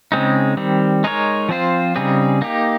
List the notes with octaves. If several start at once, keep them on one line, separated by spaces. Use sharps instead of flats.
C#3 G#3 C4 D#4
D#3 G3 C4
G#3 D#4 A#4 C#5
F3 C4 F4 C5
C#3 G3 C4 D#4 G#4
A#3 D#4 G4